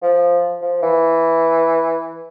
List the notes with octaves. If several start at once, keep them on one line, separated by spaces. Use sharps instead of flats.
F3
F3
E3